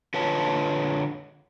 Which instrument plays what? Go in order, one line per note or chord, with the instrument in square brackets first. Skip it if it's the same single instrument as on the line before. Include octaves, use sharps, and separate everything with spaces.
[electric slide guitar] D3 F4 B4 C#5 D#5 A5